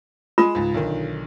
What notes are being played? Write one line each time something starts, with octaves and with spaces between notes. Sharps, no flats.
G#3 F4 D#6 E7
C#2 G#2
B1 D3 D#3